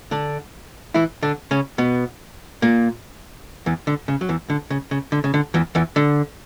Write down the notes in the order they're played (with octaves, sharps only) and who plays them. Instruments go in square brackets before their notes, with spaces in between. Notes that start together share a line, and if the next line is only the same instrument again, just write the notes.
[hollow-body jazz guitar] D3 D4
E3 E4
D3 D4
C#3 C#4
B2 B3
A#2 A#3
E2 E3
D3
C#3
F#3
E2 E3
D3
C#3
C#3
D3
C#3
D3
E2 E3
E2 E3
D3